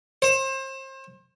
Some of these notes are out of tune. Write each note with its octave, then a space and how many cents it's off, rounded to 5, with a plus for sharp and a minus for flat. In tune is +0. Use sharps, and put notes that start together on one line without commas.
C5 +30